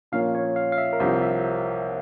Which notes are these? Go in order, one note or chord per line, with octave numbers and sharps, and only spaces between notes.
A#2 F3 A#3 C#4 F4 F5
C#5
F5
F5
E5
A#4
C2 C3 F3 C5
E5